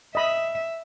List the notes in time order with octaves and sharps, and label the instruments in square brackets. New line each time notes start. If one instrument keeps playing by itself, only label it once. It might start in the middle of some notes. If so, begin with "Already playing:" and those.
[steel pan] D#5 B5 D#6 [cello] E5